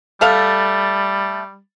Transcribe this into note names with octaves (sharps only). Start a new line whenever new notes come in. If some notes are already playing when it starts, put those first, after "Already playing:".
G3 A3 A4 F5